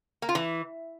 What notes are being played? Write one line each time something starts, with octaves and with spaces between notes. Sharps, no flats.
A#3
F4
E3